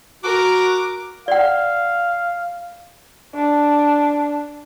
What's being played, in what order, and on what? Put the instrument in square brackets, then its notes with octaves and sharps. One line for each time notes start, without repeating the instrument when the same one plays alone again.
[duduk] F#4 [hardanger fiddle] A#4 [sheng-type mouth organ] D6
[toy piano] D5 F#5 [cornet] F5
[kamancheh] D4